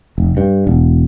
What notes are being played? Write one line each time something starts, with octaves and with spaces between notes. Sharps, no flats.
F1
G2
E1